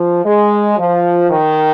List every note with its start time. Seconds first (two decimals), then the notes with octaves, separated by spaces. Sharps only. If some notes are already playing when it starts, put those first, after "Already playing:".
Already playing: F3
0.24 G#3
0.77 F3
1.29 D#3